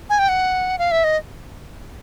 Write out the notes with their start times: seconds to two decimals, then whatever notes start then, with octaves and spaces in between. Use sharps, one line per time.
0.10 G#5
0.19 G5
0.29 F#5
0.79 F5
0.91 E5
1.04 D#5